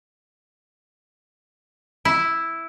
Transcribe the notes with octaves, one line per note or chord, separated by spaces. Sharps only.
E4